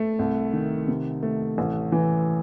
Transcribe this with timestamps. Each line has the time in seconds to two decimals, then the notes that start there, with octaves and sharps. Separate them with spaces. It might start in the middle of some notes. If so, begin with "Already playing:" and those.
Already playing: A3
0.19 C2
0.53 D#3
0.88 C3
1.23 A3
1.58 A1
1.92 E3